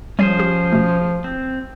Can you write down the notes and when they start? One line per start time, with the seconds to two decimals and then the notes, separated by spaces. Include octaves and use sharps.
0.19 F3 G3 C#4 G#4 C5 C#5
0.39 G4
0.73 B2 A3
1.24 C4